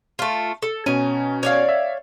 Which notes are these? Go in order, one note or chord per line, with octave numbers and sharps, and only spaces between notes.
A3 F4
A4
B2 C#4 G#5 A#5
C#5 D5 F5
E5